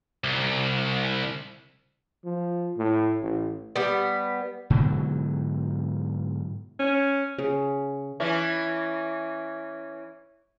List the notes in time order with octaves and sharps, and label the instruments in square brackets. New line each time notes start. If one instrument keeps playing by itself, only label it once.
[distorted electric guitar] C2
[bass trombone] F3
A2
A1
[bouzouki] G3 B3
[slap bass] G#2 B2 D3 F#3
[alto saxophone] C#4
[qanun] C#3
[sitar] E3 C#4